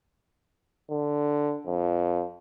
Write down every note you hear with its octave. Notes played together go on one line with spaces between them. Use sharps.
D3
F2